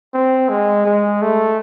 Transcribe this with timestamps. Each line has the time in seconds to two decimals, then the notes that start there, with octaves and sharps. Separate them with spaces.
0.14 C4
0.49 G#3
0.86 G#3
1.22 A3